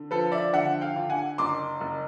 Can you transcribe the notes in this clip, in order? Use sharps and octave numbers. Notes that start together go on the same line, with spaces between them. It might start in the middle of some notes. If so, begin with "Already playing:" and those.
Already playing: D3
F3 A4 B4
D5 E5
D3 E5 F#5
F5 G5
D3
F#5 G#5
F#1 C6 D6
F#1